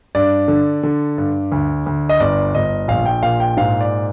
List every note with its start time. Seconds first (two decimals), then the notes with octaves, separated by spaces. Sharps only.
0.15 G2 D5
0.48 D3
0.83 D3
1.18 G2
1.52 D2
1.86 D2
2.09 D#5
2.20 G1 D5
2.55 G1 D#5
2.88 A#1 F5
3.06 G5
3.23 A#2 F5
3.40 G5
3.57 G#2 F5
3.81 D5